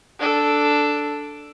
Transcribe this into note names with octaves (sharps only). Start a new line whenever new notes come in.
D4 A4